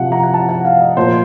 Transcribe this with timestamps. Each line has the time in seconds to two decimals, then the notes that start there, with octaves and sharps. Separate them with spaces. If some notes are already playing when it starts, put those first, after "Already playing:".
Already playing: C3 F3 F#5
0.12 A#5
0.23 F#5
0.34 A5
0.49 F#5
0.65 F5
0.81 D#5
0.97 A#2 F3 C5